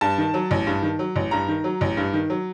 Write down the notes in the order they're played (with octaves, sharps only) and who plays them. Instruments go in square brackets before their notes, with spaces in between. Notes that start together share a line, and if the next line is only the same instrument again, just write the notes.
[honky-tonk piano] G2 A5
D#3
F#3
A1
G2
D#3
F#3
A1
G2 A#5
D#3
F#3
A1
G2
D#3
F#3